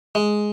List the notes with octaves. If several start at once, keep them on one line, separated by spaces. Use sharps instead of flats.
G#3